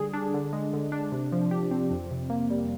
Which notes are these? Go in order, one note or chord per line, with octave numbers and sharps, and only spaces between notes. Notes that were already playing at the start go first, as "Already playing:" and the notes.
Already playing: D3 G3 G#4
D4
D3
G#3
D3
D4
C3
F3
G4
C4
F2
C3
A#3
G3